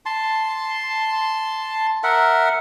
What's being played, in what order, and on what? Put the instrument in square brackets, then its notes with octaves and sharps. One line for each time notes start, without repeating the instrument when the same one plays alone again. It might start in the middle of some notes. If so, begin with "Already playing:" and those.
[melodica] A5 C6
A#4 E5 F#5